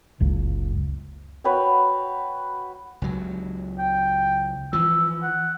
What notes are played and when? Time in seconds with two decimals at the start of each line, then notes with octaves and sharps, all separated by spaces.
0.20 F#1 C#2
1.44 F#4 B4 C#5 G5
3.02 C#2 F#3
3.79 G5
4.73 E3 F3 E6
5.22 F#5